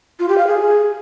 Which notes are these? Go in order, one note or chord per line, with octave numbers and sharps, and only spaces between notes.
F4
G4
F5
G#4